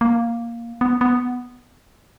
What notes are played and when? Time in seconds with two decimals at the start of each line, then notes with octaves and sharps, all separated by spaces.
0.01 A#3
0.81 B3
1.01 B3